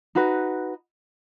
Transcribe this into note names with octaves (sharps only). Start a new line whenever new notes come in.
D#4 F#4 B4